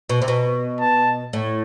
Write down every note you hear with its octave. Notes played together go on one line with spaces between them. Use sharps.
B2
C3
B2
A5
A2